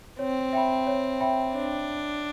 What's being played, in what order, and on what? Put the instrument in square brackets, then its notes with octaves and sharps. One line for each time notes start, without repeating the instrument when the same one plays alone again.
[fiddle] C4 [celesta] C#5
[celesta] E5 G5 B5
C#5
E5 G5 B5
[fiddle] D4 [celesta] C#5